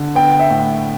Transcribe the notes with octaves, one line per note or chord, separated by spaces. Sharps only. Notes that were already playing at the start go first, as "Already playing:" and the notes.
Already playing: D3
B3 G5
E5
A2